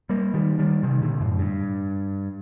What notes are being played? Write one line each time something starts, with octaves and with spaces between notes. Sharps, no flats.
G3 A#3
D#3 G3
D#3 G3
C3 D#3
A#2 D3
F#2 A2
G2